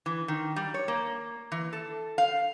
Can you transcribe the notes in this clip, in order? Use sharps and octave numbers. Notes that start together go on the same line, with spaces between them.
E3
D#3
G3
C#5
A#3
E3
A4
F5